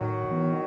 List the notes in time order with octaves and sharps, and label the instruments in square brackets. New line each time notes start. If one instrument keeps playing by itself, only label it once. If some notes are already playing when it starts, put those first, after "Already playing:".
[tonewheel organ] A2 [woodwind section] D#3 F#3
[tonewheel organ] E3 B3